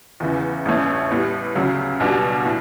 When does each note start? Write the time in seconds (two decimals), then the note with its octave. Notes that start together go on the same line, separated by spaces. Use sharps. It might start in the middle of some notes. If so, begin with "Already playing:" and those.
0.20 E2 C#3 E3
0.65 A1 G2 E3 A3 C#4
1.11 A2 G3 B3
1.55 D2 C#3 F#3
2.00 B1 B2 G3 D4 F#4
2.45 A2